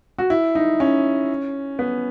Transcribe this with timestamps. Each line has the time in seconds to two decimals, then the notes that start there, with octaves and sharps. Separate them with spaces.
0.18 F#4
0.30 E4
0.55 D#4
0.80 C#4
1.79 B3